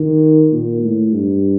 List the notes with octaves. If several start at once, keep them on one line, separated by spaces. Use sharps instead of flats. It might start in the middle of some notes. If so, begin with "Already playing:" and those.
Already playing: D#3
A#2
A2
G2